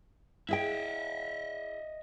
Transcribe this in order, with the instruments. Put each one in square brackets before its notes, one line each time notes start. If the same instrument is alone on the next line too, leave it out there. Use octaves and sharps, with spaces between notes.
[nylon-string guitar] E4 G#4 G5 [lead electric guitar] D#5 E5